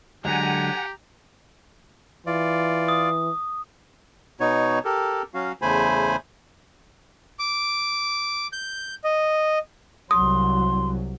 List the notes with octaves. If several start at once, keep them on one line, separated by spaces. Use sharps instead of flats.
D3 F#3 G#3 G4 F#5 G#5 A#5
E3 F4 D5
D#6
B2 B3 D#4 C#5
G4 A4 A#4
F#3 C#4 F#4 F5
E2 C#3 A3 C5 G#5 B5
D6
G6
D#5
C2 F#3 C6 D#6